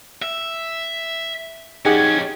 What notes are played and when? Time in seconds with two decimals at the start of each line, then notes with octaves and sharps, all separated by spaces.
0.22 E5
1.85 F2 C#4 D#4 G4 G#4 F#5 G#6